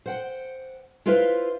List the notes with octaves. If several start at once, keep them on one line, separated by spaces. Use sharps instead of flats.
C5 F#5 G5
E4 F4 B4 C5 E5 F5